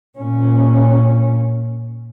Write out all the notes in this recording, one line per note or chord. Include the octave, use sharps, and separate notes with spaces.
A#2 C#4